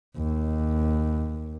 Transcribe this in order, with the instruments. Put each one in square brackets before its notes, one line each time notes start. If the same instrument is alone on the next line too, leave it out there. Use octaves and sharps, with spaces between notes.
[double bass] D#2